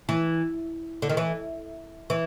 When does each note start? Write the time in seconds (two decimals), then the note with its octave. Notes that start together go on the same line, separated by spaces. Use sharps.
0.09 E3
1.02 D3
1.09 D#3
1.17 E3
2.10 E3